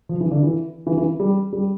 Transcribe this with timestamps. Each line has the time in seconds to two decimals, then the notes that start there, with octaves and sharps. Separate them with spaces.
0.09 F3
0.21 E3
0.31 D3
0.43 E3
0.87 E3
0.97 E3
1.20 G3
1.53 G3